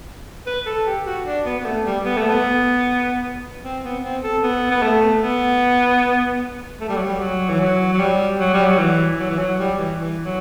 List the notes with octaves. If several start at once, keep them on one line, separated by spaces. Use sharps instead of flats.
B4
A4
G4
F#4
D4
B3
B3
A3
G3
B3
A3
B3
C4
B3
C4
A4
B3
B3
A3
B3
A3
G3
F#3
G3
F#3
E3
F#3
F#3
G3
F#3
G3
F#3
E3
F#3
E3
F#3
G3
E3
E3
F#3